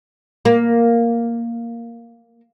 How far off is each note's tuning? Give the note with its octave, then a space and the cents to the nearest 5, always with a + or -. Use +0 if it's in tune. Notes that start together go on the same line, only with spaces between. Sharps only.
A#3 +0